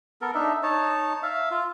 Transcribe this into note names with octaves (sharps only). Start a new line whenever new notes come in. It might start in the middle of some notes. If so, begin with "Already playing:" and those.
B3 A4 A#4
D4 D#4 E5
D#4 C#5 A5
E5 F5
F4